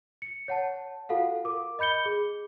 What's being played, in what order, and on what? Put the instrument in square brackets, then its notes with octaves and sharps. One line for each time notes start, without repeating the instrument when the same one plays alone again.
[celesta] C#7
C#5 F#5 A5
F4 F#4 A4 F5 F#5
A#4 D6
D#5 B5 G6 C#7 G7
G#4